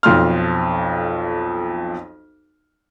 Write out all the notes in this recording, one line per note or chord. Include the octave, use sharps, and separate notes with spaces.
B1 F2 C6 F6